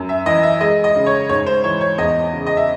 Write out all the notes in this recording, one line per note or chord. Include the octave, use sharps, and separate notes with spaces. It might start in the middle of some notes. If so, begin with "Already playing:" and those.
Already playing: F#2
E5
E3 D#5
E5
G#3 D#5
D#5
C#3
C#5
G#2 C#5
C5
E3 C#5
C#5
E2 D#5
C#3
D#5
E5